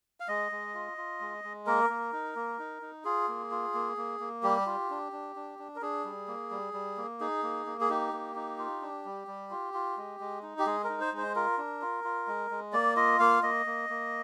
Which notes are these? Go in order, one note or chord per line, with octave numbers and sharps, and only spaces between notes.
F5
G#3 D#5
G#3
F4
F4
G#3
G#3
A#3 A#4
A#3
D#4
A#3
D#4
D#4
F4 G#4
A#3
F4
A#3
A#3
A#3
G3 G4
F4
D4
D4
D4
D4
A#4
D4 G#4
G3
A#3
G3
G3
A#3
D#4 G#4
A#3
A#3
G#4
D#4 G4
A#3
D#4
F4
D4
G3
G3
F4
F4
G#3
G#3
D#4
G4
G#3 G#4
A#4
D#4
C5
G#3 C5
F4 A#4
D4
F4
F4
G#3
G#3
A#3 D5
F4 D#5
A#3 F5
A#3 D#5
A#3
A#3